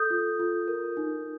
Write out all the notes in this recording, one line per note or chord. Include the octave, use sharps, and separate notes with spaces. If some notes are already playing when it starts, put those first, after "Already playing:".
Already playing: A4 D#6 G6
F4
F4
A#4
D#4